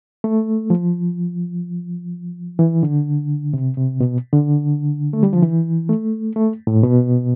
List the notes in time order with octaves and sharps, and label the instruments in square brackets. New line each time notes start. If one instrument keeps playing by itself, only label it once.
[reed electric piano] A3
F3
E3
D3
C3
C3
B2
D3
A3
G3
F3
E3
A3
A3
A2
B2